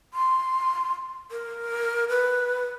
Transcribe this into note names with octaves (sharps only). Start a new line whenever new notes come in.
C6
A#4
B4